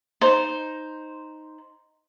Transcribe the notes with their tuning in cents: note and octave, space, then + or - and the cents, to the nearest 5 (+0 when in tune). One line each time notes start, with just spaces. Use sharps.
D#4 +0 C5 +0